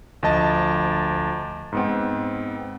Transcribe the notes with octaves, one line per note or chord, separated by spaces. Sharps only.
D2 F3 D#5 A5 A6
G#2 B3 C4